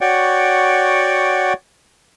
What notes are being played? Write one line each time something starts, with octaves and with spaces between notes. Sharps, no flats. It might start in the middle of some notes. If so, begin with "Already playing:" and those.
F#4 C#5 D5 F#5 G5